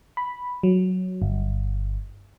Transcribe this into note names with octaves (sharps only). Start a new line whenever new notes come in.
B5
F#3
G1